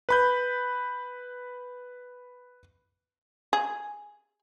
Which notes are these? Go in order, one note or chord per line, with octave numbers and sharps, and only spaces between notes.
B4 B5 G6
G#4